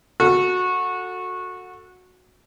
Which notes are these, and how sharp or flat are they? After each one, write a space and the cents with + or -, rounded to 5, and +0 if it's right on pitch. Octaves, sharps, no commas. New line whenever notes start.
F#4 -20 A4 +20